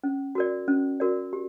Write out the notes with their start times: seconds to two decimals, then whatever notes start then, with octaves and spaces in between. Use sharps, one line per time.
0.04 C#4
0.35 F#4 A#4 D5
0.68 C#4
1.00 F#4 A#4 D5
1.33 G4